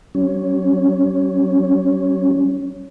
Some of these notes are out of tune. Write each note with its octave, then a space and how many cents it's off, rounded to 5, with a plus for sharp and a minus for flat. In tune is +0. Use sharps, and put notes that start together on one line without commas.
F#3 +45 C#4 +0